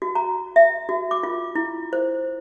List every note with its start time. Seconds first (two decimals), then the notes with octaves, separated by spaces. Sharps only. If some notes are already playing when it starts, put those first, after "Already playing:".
0.02 F#4
0.15 A#5
0.56 E5
0.89 F#4
1.11 D6
1.23 F4
1.55 E4
1.93 C5